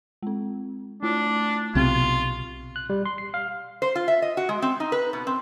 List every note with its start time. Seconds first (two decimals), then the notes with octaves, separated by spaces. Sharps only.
0.23 G#3 C4
1.03 A3 D4 E4 F4
1.75 B1 C3 C4 F4 C#6
2.76 F#6
2.90 G3
3.06 C6
3.18 C7
3.34 F5
3.82 C5
3.96 F4
4.08 E5
4.22 D#5
4.37 F#4
4.49 G#3
4.62 C4
4.80 D#4
4.92 B4
5.13 B2
5.27 C4